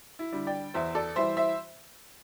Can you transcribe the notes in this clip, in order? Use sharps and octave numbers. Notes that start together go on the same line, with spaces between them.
E4
D3 G3
D5 G5
E2 C5 E5
A4 D5
E3 G3 C5 E5
C5 E5